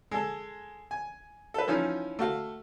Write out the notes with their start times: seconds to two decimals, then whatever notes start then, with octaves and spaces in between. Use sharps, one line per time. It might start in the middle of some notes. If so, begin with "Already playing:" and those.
0.11 G#3 A4
0.91 G#5
1.54 A4 B4
1.67 E3 F3 C#4 D#4
2.19 A3 F#4 F5